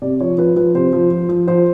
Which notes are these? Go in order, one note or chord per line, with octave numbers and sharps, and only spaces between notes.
C3 D5
F3 C#5
F3 B4
F3 B4
C3 C5
F3
F3
F3
F3 C5